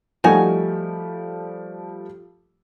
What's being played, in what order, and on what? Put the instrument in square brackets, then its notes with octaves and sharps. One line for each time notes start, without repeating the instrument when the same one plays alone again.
[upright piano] F3 G3 A3 [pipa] D#4 F#4 G#5